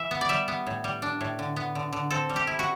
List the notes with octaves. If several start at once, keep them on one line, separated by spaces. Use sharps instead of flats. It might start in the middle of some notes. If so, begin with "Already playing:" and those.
Already playing: E3 E5
B3
D5
G3 E5
B3
A2
G3
D4
A2
D3
B3
D3
D3
C4 A4
G3
G4
E4
F#4